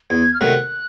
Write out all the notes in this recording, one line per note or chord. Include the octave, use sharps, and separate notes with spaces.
E2 G#6
F6
C3 D#3 F#3 A3 F#6